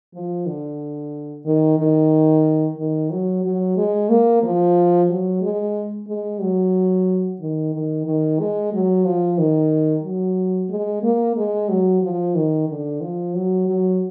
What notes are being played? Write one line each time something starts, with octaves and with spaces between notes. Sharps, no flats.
F3
D3
D#3
D#3
D#3
F#3
F#3
G#3
A#3
F3
F#3
G#3
G#3
F#3
D#3
D#3
D#3
G#3
F#3
F3
D#3
F#3
G#3
A#3
G#3
F#3
F3
D#3
D3
F3
F#3
F#3